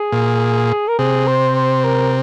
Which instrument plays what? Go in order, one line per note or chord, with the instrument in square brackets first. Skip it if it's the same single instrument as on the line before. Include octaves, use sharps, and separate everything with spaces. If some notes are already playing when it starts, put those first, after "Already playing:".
Already playing: [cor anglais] G#4
[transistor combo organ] A#2
[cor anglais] A#4
[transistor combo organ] C3 [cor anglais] G#4
[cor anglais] C5
C5
A#4